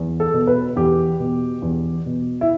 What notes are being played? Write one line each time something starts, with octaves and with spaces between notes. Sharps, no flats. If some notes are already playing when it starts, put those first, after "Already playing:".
Already playing: E2
A4
B2
B4
E2 G4
B2
E2
B2
E4